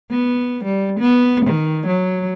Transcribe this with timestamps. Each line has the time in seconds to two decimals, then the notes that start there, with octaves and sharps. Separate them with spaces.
0.11 B3
0.65 G3
1.00 B3
1.45 D#3
1.87 F#3